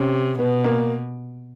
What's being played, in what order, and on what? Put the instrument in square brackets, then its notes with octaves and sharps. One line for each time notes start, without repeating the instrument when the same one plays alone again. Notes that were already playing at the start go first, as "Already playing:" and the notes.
Already playing: [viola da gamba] C3 [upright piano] C#4
[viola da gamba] B2 [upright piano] B3
[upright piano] A#3